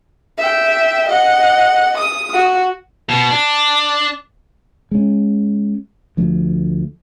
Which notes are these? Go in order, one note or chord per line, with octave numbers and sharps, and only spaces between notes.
E5 G5
D#5 F#5
D#6
F#4
B2
D4
G#3 C#4
D2 F3 A3